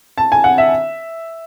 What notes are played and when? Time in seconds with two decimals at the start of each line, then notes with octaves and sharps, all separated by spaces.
0.18 A5
0.32 G#5
0.44 F#5
0.58 E5